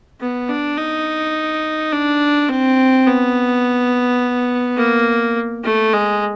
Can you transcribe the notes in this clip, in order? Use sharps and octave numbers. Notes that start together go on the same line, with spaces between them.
B3
D4
D#4
D4
C4
B3
A#3
A3
G#3